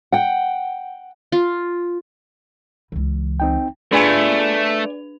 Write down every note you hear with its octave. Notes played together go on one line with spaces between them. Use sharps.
F#5 G5
F4
C#2 E3
C4 D#4 G5
A3 D4 B4 D5 G#5 F7